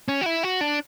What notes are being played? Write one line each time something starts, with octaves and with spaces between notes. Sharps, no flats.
C#4
F#4
E4
F#4
D4